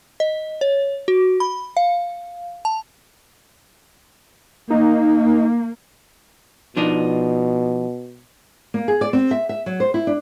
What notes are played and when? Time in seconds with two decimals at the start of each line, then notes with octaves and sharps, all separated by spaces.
0.20 D#5
0.61 C#5
1.08 F#4
1.40 B5
1.77 F5
2.65 A5
4.70 A#3 D#4
6.77 B2 F3 D4 D#4
8.74 A#3
8.88 G#4
9.01 D5
9.13 C4
9.31 E5
9.49 E5
9.66 F#3
9.80 C5
9.94 E4
10.07 D4